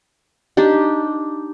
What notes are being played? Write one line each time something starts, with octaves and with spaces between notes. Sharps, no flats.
D4 D#4 G4